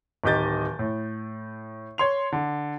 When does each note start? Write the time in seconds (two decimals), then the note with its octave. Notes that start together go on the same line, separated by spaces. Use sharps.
0.24 D1 D#3 G4 D#5 G6 A6
0.79 A2
1.98 C#5 C6 F7
2.32 D3